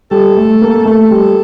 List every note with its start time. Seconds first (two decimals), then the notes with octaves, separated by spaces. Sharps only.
0.11 G3 A4
0.37 A3
0.61 A#3
0.85 A3 A4
1.11 G3